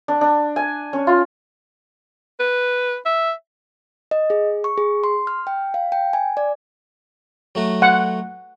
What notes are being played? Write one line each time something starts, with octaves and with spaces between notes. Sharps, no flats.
D4
D4
G#5
C#4
F4
B4
E5
D#5
G#4
C#6
G#4
C6
F6
G5
F5
G5
G#5
D5
F#3 A3 F#4
F#5